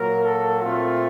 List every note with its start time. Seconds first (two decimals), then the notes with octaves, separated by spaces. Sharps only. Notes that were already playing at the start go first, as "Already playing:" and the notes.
Already playing: A#2 F#3 A#3 A#4
0.24 A4
0.62 A#2 A3 C4 F4